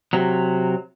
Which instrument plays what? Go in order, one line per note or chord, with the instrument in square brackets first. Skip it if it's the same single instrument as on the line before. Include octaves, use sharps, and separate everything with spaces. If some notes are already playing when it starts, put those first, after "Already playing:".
[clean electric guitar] C3 F#3